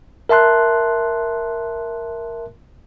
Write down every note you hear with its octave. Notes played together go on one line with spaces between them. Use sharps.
A#4 E5 A5 C6 F#6